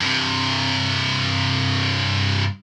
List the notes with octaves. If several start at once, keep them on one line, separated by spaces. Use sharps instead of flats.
G2 C3